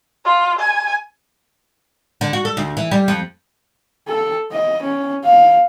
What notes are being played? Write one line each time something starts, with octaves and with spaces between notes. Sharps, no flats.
F4
G#5
D3
F#4
A4
D2
E3
G3
F2
A4
D#5
C#4
F5